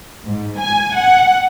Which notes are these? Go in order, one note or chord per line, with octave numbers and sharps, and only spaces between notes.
G#2
G#5
F#5